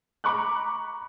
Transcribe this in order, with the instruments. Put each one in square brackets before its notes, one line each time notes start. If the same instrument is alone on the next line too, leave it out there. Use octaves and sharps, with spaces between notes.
[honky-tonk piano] A#5 B5 C#6 D6 F#6